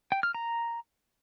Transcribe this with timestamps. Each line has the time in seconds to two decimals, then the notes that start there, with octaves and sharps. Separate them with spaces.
0.12 G5
0.23 F6
0.35 A#5